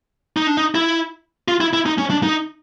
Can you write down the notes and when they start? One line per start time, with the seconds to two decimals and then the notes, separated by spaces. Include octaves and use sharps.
0.37 D#4
0.47 D4
0.57 D#4
0.75 E4
1.48 F4
1.61 E4
1.73 E4
1.86 D#4
1.98 C#4
2.10 D4
2.23 D#4